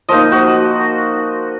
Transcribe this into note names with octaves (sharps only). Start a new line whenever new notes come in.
F3 A#3 D#4 D#5
F#4